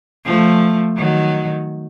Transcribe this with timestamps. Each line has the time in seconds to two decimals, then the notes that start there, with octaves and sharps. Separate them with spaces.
0.25 F3 A3
0.97 D#3 F#3